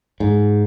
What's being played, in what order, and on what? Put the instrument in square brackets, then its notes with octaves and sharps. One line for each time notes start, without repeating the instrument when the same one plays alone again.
[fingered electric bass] G#2